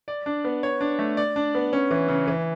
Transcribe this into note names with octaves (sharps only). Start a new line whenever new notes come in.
D5
D4
B3
C#5
D4
A3
D5
D4
B3
C#4
E3
C#3
E3